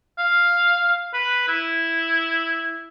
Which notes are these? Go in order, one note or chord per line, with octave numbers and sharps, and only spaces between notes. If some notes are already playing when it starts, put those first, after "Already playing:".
F5
B4
E4